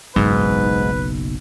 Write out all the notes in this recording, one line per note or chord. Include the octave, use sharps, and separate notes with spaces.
F#1 B1 G#2 B4